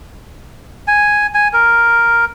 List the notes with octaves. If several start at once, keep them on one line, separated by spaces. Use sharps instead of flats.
G#5
G#5
A#4